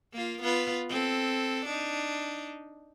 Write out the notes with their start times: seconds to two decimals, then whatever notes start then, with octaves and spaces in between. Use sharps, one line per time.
0.13 A#3 F4
0.42 B3 F4 B4
0.89 C4 A4
1.66 D4 D#4